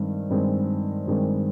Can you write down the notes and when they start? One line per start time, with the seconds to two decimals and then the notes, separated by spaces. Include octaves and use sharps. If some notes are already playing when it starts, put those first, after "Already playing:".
Already playing: G2 D#3 G#3 C4
0.30 G2 D#3 G#3 C4
1.07 G2 D#3 G#3 C4